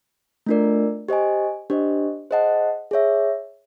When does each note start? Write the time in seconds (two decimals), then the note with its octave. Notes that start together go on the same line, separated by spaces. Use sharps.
0.46 A3 D4 F4 A#4 D5
1.08 G4 C5 D#5 G#5
1.70 D4 G4 C5 D#5
2.31 G#4 C5 D#5 F#5 A5
2.91 G#4 C#5 E5